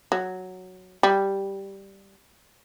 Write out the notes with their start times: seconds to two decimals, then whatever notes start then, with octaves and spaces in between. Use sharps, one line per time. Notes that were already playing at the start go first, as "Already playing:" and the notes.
0.12 F#3
1.03 G3